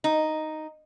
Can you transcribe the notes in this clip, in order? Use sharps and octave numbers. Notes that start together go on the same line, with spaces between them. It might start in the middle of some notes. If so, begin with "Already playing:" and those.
D#4